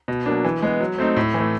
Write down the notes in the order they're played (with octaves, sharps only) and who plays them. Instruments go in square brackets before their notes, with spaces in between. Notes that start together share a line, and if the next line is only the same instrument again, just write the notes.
[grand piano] B2
F#3 A#3 D4
E3
G#3 B3
F#3
A3 C4 D#4
A2
E3 A3